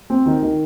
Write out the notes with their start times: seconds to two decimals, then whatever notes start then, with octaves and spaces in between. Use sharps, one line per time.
0.10 C4
0.26 D#3
0.43 D#3